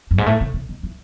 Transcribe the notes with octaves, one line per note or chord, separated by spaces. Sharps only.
F#2
G#2
A2
C3
C3
D#3
E3